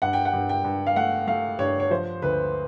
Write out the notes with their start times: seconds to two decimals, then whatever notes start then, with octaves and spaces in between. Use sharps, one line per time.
0.02 G2 F#5
0.13 G5
0.25 F#5
0.33 G2
0.49 G5
0.64 G2
0.87 F5
0.96 A3 F#5
1.27 A3 F5
1.59 G2 C#5
1.80 C#5
1.90 F3 C5
2.22 D2 B4